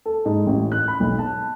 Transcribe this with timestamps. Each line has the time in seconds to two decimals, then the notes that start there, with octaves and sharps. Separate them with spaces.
0.06 A4
0.25 G#2
0.47 A1
0.72 F#6
0.88 B5
1.00 B1
1.19 A5